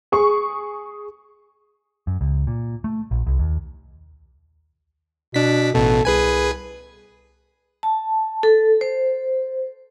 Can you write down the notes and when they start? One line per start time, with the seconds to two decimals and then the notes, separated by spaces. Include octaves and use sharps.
0.12 G#4 C#6
2.07 F#2
2.21 C#2
2.47 A#2
2.84 A3
3.11 A#1
3.26 C2
3.39 D#2
5.34 B2 D4 B6
5.74 A1 B2 A4
6.05 C2 G#4 B4 G#5
7.83 A5
8.43 A4
8.81 C5